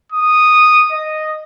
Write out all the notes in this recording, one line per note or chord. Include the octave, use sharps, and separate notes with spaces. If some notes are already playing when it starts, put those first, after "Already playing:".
D#6
D#5